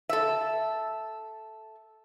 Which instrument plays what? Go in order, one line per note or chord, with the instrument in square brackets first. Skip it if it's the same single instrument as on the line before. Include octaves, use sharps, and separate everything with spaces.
[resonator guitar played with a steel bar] A4 E5